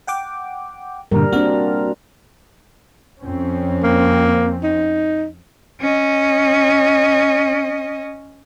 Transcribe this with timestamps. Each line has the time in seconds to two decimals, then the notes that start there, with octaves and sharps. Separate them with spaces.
0.07 F#5 G5 D6
1.11 G2 A#2 D3 G3 A#4
1.32 A#3 C4 D4 F#4 F6
3.20 F2 C4 C#4
3.83 A#3
4.63 D#4
5.80 C#4 D#5